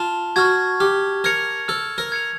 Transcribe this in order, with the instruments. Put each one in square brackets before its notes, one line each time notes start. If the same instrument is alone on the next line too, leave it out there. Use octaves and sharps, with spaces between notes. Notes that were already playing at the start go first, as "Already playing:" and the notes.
Already playing: [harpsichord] F4 [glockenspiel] A5
[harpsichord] F#4 [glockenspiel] C#6 F6 G#6
[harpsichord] G4 [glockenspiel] F6
[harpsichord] A#4 [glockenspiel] G#6 C#7 F7
[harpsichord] A4 [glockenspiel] F6
[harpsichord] A#4
[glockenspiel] G#6 C#7 F7